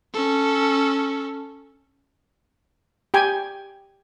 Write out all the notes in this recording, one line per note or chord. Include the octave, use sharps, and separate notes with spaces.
C#4 A4
G4 G5 G#5